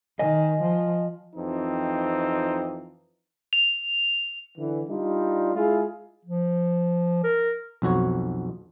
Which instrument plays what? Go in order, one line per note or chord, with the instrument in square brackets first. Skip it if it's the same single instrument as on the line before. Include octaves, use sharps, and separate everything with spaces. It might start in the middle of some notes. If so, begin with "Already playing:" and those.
[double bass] D#3 [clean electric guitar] D#5 G#5
[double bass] F3
[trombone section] F2 E3 C4 D#4
[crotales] F7
[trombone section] D3 E3
G3 D4 D#4 F4
G#3 E4 F4 G#4
[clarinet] F3
A#4
[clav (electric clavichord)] B1 F2 F#4 C#5